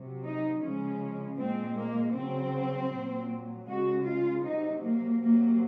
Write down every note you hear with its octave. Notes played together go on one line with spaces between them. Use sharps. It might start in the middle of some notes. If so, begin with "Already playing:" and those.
Already playing: C3 F#3
D#4
C#3 F3 G#3 C#4
A#2 G#3 C4
A#3
C#3 F#3 C4
A#2 F#3
C#3 G#3 F#4
F4
C3 F#3 D#4
A#3
C3 F#3 A#3